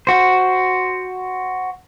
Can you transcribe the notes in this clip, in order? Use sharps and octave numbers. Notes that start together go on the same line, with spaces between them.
F#4 C5